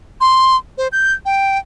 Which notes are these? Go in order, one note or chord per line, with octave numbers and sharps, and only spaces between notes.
C6
C5
G6
G5